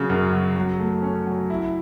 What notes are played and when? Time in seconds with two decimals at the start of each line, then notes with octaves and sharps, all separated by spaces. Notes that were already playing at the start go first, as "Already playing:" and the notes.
Already playing: C#3 F#3
0.10 F#2
0.33 F#3
0.56 F#3
0.79 A3
1.02 C#4
1.27 F#3
1.50 E4